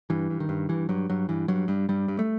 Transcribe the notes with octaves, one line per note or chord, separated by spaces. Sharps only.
G2 E3
G2
D#3
G2
G2 E3
G2 F#3
G2 F#3
G2 E3
G2 F#3
G2 G3
G2 G3
G2
A3